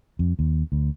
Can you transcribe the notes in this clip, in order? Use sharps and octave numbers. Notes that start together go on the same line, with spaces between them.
F2
D#2
D2